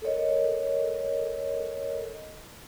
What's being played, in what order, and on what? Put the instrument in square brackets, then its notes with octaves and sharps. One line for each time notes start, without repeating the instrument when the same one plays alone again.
[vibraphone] A4 A#4 C#5 D#5